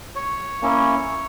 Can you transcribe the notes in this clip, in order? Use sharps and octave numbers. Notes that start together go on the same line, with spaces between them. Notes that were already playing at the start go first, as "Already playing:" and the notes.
C#5
A#3 C#4 E4